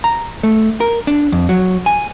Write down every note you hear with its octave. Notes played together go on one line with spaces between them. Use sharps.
A#5
A3
A#4
D4
F2
F#3
G#5